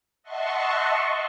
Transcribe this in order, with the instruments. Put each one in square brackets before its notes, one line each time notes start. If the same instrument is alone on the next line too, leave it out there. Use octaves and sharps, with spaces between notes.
[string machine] D#5 E5 F#5 A5 C6 C#6